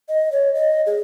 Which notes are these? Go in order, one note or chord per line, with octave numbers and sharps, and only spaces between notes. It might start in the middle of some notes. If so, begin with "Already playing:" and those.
D#5
C#5
D#5
G#4